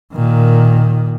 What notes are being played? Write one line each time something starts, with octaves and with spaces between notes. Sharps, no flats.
A#2 D#3